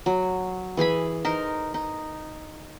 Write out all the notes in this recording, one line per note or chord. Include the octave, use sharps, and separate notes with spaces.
F#3
E3 G#4 G#5 B5
D#4 A#4 C5
D#4